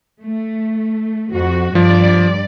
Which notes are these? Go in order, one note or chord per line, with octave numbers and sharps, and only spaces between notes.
A3
F2 F#4
G2 F3 G3 D5